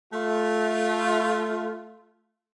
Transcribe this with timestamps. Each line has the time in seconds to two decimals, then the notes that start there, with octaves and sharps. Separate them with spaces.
0.13 A3 F4